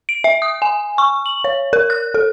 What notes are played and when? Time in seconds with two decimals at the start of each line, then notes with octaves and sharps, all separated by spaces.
0.09 D7
0.24 E5
0.42 D#6
0.62 G#5
0.98 C#6
1.26 F#7
1.44 C#5
1.73 A#4
1.90 F#6
2.14 A4